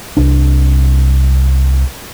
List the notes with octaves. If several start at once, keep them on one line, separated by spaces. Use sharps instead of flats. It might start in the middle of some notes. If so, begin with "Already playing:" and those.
C2 D4